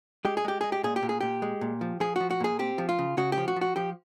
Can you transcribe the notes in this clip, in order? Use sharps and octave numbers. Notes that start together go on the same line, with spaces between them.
G#3 G4
G#4
G#3 G4
G#3 G#4
G4
A#2 G#4
G4
A#2
G#4
A#2 G4
G#3
A#2
F3
F3 G#4
F3 F#4
F#4
A#2 G#4
C4 G4
F3
F4
C#3
C#3 F#4
G4
F3
F#4
F3
F#4
F3 G4